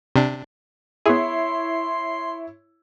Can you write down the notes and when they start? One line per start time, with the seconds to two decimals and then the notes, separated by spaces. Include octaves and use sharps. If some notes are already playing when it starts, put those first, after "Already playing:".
0.16 C3 D4
1.06 B3 E4 G#4 C#5 C6